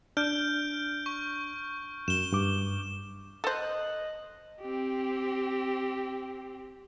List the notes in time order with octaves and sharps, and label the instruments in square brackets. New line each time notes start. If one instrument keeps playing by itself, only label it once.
[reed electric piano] D4 [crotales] F6 G6 D7
[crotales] C#6
[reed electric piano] F#2 [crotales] E7 G7
[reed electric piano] G2 D6
[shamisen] A4 C5 [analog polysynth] D#5 F#6
[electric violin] C4 G4